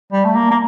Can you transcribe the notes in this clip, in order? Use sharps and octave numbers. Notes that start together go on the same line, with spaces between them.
G3
A3
A#3
A#3